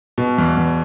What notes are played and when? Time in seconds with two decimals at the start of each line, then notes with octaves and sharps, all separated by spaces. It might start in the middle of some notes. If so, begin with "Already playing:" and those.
0.18 B2
0.38 E2
0.57 E2